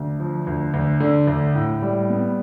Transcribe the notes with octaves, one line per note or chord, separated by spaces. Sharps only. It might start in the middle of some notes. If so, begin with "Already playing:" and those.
Already playing: D2
F3
D2
D2
D3
D2
A2
G3
B3